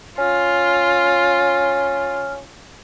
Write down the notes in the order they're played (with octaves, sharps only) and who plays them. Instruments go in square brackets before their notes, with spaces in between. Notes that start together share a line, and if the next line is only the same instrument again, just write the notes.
[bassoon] C#4 [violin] F4 [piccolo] F6